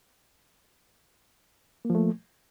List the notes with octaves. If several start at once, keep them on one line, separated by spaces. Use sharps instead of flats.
F3 A3 A#3